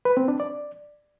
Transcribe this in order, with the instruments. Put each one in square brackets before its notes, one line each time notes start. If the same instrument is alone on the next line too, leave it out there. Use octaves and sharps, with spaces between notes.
[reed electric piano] B4
C4
D4
D5